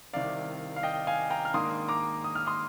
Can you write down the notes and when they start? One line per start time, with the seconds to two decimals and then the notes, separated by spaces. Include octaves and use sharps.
0.13 C2 C3 D#3 D5 F5
0.76 F5
0.83 D#5 G5
1.07 F5 G#5
1.30 G5 A#5
1.45 F6
1.54 G#2 D#3 A#3 D4 C6 D#6
1.88 A#5 D6
2.24 D#6
2.35 F6
2.47 C6 D#6